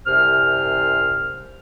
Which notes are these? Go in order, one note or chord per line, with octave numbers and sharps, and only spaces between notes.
C2 F#2 C3 C5 F6